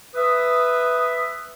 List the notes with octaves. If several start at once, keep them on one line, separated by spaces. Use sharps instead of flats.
B4 E5 D#6